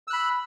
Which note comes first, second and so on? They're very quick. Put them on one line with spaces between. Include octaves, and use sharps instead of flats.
E6 F#6 B5